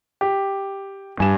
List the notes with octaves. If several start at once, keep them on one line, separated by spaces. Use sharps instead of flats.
G4
G2 G#5 E7